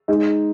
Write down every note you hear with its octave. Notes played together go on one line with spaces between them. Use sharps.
G#3 D#4 G#4